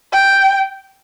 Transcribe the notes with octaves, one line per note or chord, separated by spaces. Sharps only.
G5